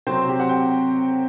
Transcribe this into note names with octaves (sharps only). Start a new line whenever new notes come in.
C3 F#3 C4 C5
G4
F#5
G5